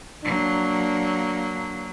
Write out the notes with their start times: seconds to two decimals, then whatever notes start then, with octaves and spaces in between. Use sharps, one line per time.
0.24 F#3 A#3 D4